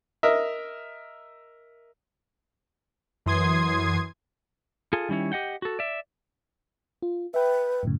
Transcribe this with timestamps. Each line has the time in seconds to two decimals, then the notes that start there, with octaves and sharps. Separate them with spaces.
0.23 A#4 D#5 E5
3.26 F#2 E3 C6 D#6 G#6 C7
4.93 F4 G#4 A4
5.09 D#3 G3 C#4 E4 C#5
5.32 G4 D#5 F#5 G5
5.62 F#4 A4
5.79 D5 E5
7.02 F4
7.34 B4 E5 G5
7.83 F#2 A2 C#3